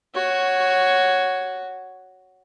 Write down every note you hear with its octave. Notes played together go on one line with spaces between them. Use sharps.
F#4 C#5